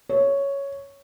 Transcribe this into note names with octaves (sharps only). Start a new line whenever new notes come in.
C#5